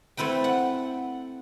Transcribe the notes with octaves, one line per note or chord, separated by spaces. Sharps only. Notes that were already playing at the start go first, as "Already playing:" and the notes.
A3 C4 E4 B4 G5
F#5